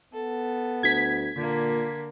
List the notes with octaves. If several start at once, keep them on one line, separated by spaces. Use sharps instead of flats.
B3 A4
D2 G#6 B6
A#2 D3 A#3